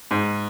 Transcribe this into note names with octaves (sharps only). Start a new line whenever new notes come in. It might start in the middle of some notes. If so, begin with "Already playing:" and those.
G#2